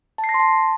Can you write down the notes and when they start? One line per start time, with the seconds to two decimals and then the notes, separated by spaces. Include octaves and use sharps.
0.18 A5
0.24 C7
0.29 A#6
0.34 C6
0.40 A5